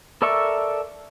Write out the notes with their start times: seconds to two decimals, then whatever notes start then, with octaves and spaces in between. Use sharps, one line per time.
0.22 A4 A#4 D5 E5 C#6